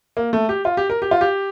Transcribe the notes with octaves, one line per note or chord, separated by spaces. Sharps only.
A#3
A3
G4
F4
G4
A#4
G4
F4
G4